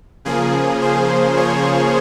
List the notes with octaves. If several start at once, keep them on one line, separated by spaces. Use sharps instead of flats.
C#3 F3 A#3 G#4
C5
C#5